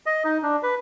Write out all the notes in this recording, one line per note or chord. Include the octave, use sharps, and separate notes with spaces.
D#5
D#4
D4
B4